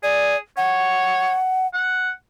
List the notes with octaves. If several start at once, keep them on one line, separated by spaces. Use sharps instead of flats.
G#4 D5
C#5 F#5
F#5